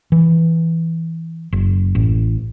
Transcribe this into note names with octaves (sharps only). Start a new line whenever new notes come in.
E3
F#1
A1